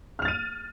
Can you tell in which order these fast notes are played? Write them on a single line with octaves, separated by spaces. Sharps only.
F6 F7 A6 D#7